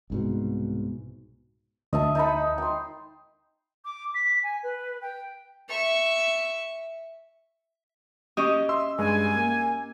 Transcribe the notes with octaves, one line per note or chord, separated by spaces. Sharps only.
C2 G#2 B2
D2 D#5 E5 A5
D#4 A5 B5
G5 C6
D6
B6
G#5
B4
G5
E5 C#6
C#4 G4 D#5 C#6 D#6
E5 C6 E6
G2 G#3 G#5
A#3